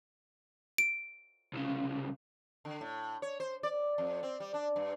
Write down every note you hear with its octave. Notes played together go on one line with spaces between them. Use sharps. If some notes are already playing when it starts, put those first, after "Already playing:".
D7
C2 C#3
D3
A2
C#5
C5
D5
F2
C4
G3
D4
G2